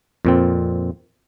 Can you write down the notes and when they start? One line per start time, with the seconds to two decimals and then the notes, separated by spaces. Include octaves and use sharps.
0.25 F2 A#2 C4